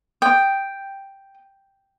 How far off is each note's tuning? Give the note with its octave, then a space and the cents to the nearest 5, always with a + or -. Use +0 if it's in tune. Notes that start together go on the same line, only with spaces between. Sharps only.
G5 +0 D#6 +0